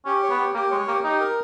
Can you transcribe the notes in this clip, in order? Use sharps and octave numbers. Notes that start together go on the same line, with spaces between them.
C#4 G4
C#5
B3
G4
A#3 G4
G#3 C#5
A#3 G4
D#4 G4
A#4